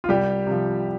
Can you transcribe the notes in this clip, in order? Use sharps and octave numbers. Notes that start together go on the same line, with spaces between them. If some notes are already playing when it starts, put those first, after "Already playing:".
F4
C2 G3 G4
C3 F3